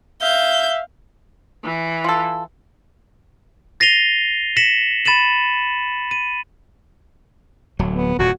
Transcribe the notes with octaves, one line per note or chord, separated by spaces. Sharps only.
E5 F5 G6
E3
F4 A4
A6 A#6 C7 D#7 F7 G7
A#6 B6 C#7 E7 F#7
B5 A6 D#7 E7 F#7
D#7
D1 F#3
B3
D#1 F2 A#2 F#4